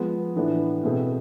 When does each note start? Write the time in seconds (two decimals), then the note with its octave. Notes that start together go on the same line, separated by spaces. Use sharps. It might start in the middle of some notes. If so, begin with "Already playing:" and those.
Already playing: F3 G#3 B3
0.36 A2 E3 B3 D4
0.83 B2 A3 C4 G#4 B4